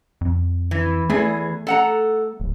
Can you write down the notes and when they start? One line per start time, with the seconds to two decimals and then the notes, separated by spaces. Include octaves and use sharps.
0.21 F2
0.71 E3
1.09 E2 E3 A3 G#4
1.67 A4 F#5 A#5
2.40 D1